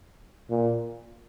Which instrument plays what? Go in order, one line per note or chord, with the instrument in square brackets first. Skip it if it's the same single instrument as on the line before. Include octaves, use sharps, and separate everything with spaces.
[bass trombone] A#2